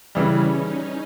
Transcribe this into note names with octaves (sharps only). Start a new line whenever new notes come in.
C#3 E3 G3 C#4
D#4